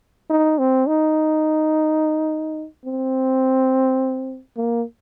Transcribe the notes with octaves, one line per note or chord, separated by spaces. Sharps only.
D#4
C4
D#4
C4
A#3